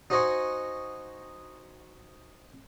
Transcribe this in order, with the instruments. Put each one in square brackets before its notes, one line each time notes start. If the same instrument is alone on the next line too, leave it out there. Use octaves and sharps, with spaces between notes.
[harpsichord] D#4 F#4 C5 D#5 G#5 C#6